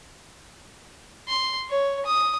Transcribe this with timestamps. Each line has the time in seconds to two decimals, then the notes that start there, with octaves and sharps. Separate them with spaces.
1.29 C6
1.69 C#5
2.06 D#6